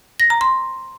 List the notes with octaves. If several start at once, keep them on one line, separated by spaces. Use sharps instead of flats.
A#6
A#5
C6